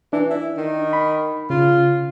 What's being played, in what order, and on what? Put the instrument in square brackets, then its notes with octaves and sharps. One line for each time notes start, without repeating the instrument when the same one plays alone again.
[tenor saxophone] E3 [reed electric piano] D4
[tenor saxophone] E4
D#3
[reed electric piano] B5
[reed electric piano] C#3 [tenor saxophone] F4